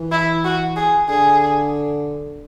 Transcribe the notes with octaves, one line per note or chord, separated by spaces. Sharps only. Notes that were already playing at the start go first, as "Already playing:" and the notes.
Already playing: E3
E4
F#4
G#4
D3 G#4